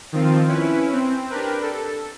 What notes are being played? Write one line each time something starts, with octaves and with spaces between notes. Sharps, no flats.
D#3 F3 C4 F4
C#4 E4 B4
C4
D4 G4 A#4 B4
A4